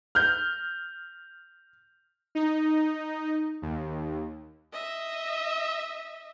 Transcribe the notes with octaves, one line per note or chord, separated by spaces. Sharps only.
F6 G6
D#4
D#2
D#5 E5